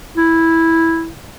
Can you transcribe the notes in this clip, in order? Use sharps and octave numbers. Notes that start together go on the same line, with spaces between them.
E4